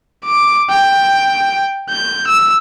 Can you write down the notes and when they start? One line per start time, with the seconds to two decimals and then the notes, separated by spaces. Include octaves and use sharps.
0.24 D6
0.70 G5
1.90 G6
2.27 E6